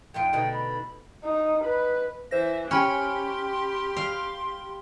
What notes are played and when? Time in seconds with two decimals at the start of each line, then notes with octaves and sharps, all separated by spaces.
0.14 F2 D#4 F4 G5
0.33 B2 D3 D#4
0.53 B5
1.24 D#4
1.64 B4
2.31 E3 C5 E5 A#6
2.71 C#4 G4 G5 B5 C6 F6
3.97 F5